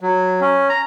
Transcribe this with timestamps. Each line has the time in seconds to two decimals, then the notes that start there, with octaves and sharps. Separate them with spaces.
0.01 F#3
0.41 C#4
0.69 A#5